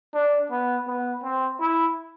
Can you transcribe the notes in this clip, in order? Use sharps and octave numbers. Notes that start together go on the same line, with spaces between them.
D4
B3
B3
C4
E4